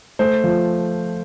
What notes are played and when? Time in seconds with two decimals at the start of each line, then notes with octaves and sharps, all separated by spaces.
0.19 A3 C5
0.44 F3